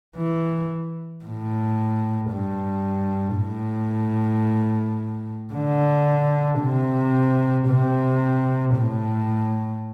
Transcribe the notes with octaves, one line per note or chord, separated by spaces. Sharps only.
E3
A2
G2
A2
D3
C3
C3
A2